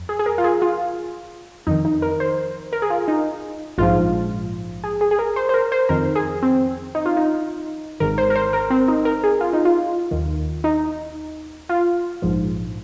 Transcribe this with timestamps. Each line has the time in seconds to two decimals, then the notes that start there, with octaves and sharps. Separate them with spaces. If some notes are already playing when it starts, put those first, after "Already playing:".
Already playing: F2
0.09 G#4
0.19 G#4
0.26 A#4
0.38 F4
0.44 G#4
0.62 F4
1.67 F2 D#3 D#4
1.85 D#4
2.02 A#4
2.20 C5
2.73 A#4
2.82 G#4
2.90 F4
3.08 D#4
3.78 A#1 G#2 F3 F4
4.84 G#4
5.01 G#4
5.11 G#4
5.19 A#4
5.36 C5
5.49 C5
5.54 A#4
5.72 C5
5.89 F2 D#3 A#4
6.16 G#4
6.43 C4
6.95 D#4
7.06 F4
7.17 D#4
8.00 G#1 G#2 D#3 A#4
8.18 C5
8.30 A#4
8.36 C5
8.53 A#4
8.70 C4
8.88 D#4
9.05 A#4
9.24 G#4
9.41 F4
9.53 D#4
9.65 F4
10.11 D#2 D#3
10.64 D#4
11.69 F4
12.22 A#1 G#2 F3